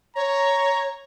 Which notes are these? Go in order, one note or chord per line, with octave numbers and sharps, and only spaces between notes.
C#5 A#5